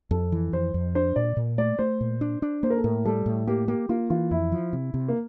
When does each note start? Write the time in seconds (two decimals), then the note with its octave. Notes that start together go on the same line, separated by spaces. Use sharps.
0.11 F2 A4
0.32 E3
0.53 F2 C5
0.74 F2
0.95 D4 C5
1.16 A#2 D5
1.37 A#2
1.58 A3 D5
1.79 A3 C5
2.01 A#2
2.21 D4
2.42 D4
2.63 A#3 C5
2.70 A#4
2.77 A4
2.84 A2 A#4
3.05 G3 A4
3.26 A2
3.47 A#3 G4
3.68 A#3 G4
3.89 A#3 F4
4.10 E3 F4
4.31 F2 E4
4.52 F3
4.73 C3
4.94 C3
5.08 A#3